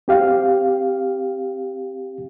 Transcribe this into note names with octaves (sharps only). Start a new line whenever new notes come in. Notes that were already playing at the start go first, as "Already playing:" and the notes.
C4 G4 F5